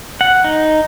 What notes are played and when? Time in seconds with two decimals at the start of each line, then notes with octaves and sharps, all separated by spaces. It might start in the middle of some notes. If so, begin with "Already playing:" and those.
0.21 F#5
0.44 D#4